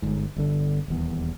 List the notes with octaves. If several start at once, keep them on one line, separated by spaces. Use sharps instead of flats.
G1 G#2
G1 D3
D#1 E2